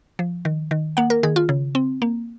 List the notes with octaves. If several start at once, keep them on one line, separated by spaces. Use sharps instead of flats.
F3
D#3
D#3
A#3 F#5
A#4
D#3 G#4
F4
C#3
C4
A#3